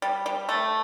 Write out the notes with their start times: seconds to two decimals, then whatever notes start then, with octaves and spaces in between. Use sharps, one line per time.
0.02 G3
0.26 G3
0.49 A3